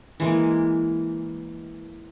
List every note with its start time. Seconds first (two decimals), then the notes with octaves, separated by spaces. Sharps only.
0.20 E3 G#3 A#3